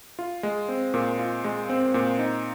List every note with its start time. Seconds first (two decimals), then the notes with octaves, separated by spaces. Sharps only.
0.19 F4
0.43 G#3
0.69 C4
0.94 A#2
1.19 F4
1.44 G#3
1.69 C4
1.94 A#2
2.19 D#4